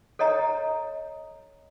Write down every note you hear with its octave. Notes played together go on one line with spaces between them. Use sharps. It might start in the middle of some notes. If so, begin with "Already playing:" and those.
A4 C#5 D#5 A#5